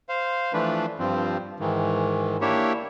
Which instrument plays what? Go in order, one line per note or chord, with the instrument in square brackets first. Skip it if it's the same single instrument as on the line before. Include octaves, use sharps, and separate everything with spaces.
[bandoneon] C5 F5
E3 F3 A3 D4 B4
G2 F3 C4
G#2 D#3 E3
A#3 D4 E4 G4 C#5 E5